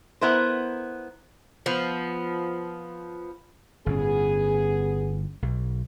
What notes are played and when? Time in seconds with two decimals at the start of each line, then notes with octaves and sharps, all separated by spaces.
0.21 B3 E4 A#4 C5
1.66 F3 B3
3.86 G1 A2 B3 C#4 G#4
5.42 B1